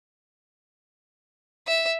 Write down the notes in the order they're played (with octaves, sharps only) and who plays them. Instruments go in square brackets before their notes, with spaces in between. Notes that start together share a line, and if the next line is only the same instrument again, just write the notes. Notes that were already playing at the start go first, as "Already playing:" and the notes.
[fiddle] E5